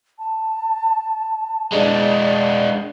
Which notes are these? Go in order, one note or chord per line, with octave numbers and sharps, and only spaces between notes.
A5
G#3 D4 D5